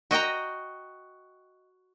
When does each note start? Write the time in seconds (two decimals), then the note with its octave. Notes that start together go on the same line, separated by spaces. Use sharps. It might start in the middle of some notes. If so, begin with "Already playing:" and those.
0.11 F#4 D#5 G5 A#5